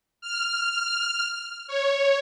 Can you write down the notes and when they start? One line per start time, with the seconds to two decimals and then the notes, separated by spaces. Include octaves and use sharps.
0.21 F6
1.67 C#5